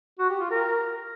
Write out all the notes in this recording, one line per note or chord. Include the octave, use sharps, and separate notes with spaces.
F#4
G4
F4
A#4